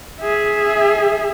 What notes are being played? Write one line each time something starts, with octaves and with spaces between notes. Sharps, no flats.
G#4 E5